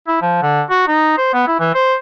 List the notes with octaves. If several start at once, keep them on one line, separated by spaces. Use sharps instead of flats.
E4
F3
D3
F#4
D#4
C5
B3
E4
E3
C5